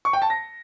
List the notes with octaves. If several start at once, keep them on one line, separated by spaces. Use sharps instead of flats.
C#6
G5
A5
A#6